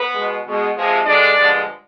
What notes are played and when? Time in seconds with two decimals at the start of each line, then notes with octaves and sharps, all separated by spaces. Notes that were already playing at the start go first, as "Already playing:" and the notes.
Already playing: B3 B4
0.14 B2 G#3
0.45 B2 G#3
0.75 C3 F3 G#3
1.06 G2 D3 G#3 D4 D5
1.37 G2 D3 F3 G#3